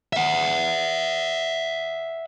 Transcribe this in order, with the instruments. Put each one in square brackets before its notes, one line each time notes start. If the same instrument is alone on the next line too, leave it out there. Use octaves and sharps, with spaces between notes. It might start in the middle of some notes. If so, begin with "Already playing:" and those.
[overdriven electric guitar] E5 F#5